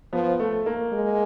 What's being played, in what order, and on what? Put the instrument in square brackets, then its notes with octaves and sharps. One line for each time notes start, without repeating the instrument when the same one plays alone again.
[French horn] F3 [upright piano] B3
[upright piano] A3
A#3
[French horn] G#3